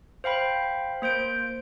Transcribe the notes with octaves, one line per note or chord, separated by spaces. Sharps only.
C5 F5 G5 B5
A#3 C5 G6 D7